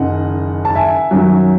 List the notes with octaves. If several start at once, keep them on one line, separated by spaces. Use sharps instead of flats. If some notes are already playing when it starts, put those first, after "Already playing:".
Already playing: F#1 F#2 D#3 D#5 F#5
A5
E5 G#5
F#2 D#3 F#3